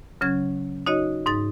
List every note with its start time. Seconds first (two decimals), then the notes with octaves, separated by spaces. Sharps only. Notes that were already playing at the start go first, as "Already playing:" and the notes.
0.21 C#3 F#3 C#4 G#6
0.86 D#4 F#4 C#5 D#5
1.26 G#2 D#4 A6